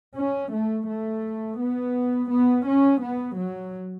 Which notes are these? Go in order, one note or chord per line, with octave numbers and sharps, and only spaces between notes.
C#4
A3
A3
B3
B3
C#4
B3
F#3